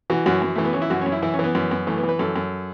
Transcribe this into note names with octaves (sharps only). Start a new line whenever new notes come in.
E3 F#4
F#2 F#4
F#2
E3 A3
B3
E3 C#4
E4
F#2 F#4
F#2 C#4
E4
E3 E4
C#4
E3
B3
F#2
F#2
E3 A3
B3
E3
B4
F#2 A4
F#2